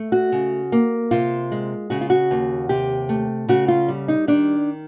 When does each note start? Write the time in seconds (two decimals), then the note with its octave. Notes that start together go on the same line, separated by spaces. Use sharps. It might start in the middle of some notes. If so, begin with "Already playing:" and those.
Already playing: A3
0.12 F#4
0.32 C#3
0.72 A#3
1.11 C3 F4
1.52 G#3
1.90 C#3 F#4
2.01 F4
2.10 F#4
2.31 D#2
2.69 C3 G4
3.09 A3
3.49 C#3 F#4
3.68 F4
3.88 G3
4.08 D#4
4.28 D#3 D4